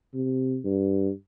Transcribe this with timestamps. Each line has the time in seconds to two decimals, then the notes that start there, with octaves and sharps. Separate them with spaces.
0.14 C3
0.64 G2